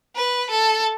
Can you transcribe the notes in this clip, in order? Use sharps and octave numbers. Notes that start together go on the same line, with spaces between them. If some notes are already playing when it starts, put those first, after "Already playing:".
B4
A4